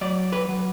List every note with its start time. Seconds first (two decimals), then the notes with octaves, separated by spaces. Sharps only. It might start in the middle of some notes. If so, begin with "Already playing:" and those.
0.01 F#3 D5
0.32 B4
0.48 F#3